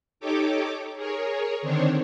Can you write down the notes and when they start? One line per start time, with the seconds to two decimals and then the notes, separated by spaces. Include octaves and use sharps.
0.20 D#4 G4 A4 C#5 D6
0.96 G#4 A#4 C#5
1.62 D3 D#3 C4 D4 C5 C#5